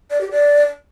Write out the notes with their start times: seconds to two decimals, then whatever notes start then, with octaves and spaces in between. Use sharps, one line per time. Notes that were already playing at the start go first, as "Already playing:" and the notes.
0.11 D5
0.21 G4
0.31 D5